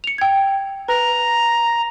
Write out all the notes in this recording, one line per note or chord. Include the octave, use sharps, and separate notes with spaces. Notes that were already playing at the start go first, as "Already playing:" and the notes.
C#7 F7
G5 G#6
B4 A#5